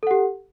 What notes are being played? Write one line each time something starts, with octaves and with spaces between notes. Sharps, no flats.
G4 A4 F#5